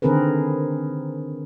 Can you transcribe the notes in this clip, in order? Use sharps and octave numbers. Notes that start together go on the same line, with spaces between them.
D3 D#3 C4 G#4 A#4 B4